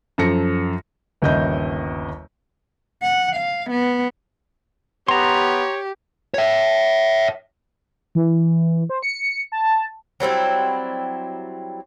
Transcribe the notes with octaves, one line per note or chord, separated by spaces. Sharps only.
F#2 F3 A4 A#6 C#7
G1 D#2 C#3 D#5 E5 G6
F#5
F5
B3
B3 G4 C#5 A#5 C6
C#5 E5
E3
C5
C#7
A5
F#3 G3 C4 E4